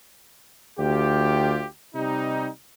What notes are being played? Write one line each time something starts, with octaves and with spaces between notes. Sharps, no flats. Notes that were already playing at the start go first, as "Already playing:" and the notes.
D2 F4 G4
C3 G3 D#4